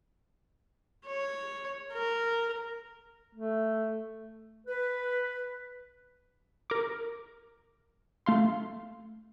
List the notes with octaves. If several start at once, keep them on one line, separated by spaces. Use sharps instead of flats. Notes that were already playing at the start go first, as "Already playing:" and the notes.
C#5
A#4
A3
B4
A#4 D6
A3 F5 C6